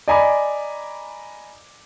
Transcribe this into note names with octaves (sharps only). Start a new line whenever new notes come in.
D5 D#5 G#5 A#5 B5 D6